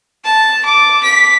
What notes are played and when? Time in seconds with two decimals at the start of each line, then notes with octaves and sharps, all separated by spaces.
0.24 A5
0.65 D6
1.03 B6